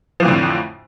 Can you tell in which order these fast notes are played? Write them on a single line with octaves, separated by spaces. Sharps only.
F3 E3 A2 D3 F2